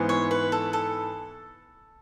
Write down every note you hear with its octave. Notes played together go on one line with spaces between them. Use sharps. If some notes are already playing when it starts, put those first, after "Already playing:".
Already playing: G#2 E3 B3
C#5
B4
A4
A4